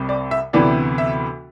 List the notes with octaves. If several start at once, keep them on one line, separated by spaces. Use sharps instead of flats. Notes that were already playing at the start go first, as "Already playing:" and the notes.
Already playing: C2 C3 G3 C4
D5
E5
D2 C3 E3 B3 E4 D5
E5